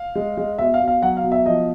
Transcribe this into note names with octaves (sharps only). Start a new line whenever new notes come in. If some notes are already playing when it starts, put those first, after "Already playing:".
Already playing: F5
G#3
G#3
B2 E5
F5
B2
F5
F#3 F#5
F5
B2
E5
F3 D#5